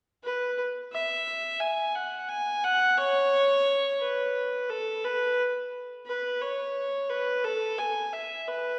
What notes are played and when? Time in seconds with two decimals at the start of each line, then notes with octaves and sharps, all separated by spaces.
0.24 B4
0.92 E5
1.60 G#5
1.95 F#5
2.29 G#5
2.64 F#5
2.98 C#5
4.00 B4
4.70 A4
5.04 B4
6.07 B4
6.41 C#5
7.10 B4
7.44 A4
7.78 G#5
8.13 E5
8.48 B4